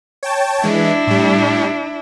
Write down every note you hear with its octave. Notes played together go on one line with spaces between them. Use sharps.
C#5 G5 A5
E3 G#3 D4 E4
A2 G3